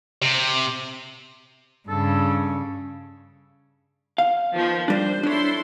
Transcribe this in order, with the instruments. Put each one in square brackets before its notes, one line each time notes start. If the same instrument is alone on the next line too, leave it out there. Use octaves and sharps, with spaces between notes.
[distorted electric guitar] C3
[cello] G2 C#3 [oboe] A4
[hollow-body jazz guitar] F5
[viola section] D#3 F3 B3
[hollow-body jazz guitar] G3 D4 [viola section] C5
[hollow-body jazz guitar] D4 C#5 [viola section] E4 A4 C6